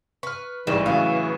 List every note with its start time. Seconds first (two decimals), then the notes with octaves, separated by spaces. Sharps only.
0.23 B4 C#6 F6
0.67 A1 G#2 E3 G3 C#6 E7
0.86 A2 C#3 F#3 F5